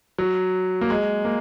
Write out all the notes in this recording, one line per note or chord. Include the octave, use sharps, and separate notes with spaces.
F#3
A#3
G#3
A#3